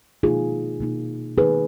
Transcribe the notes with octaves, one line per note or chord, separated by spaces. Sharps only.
B2 A#3 D#4 F4 G#4
B2 A#3 D#4
D#3 A#3 D#4 G#4 B4